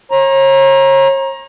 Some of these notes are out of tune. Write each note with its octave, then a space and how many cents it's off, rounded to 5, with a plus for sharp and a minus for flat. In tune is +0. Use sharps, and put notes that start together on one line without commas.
C#5 -40 A#5 +20